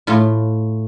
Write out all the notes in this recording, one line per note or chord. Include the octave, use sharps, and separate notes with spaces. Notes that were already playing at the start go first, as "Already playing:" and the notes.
A2 A3 F4